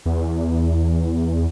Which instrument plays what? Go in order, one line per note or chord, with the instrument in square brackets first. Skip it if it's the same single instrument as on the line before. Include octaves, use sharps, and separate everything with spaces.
[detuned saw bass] E2